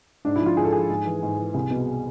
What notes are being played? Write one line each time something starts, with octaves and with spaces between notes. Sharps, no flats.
G#2 D4
F3 E4
F4
G#2 G#4
A4
F3 G#4
G#2
E3
G#2
E3
C2
B2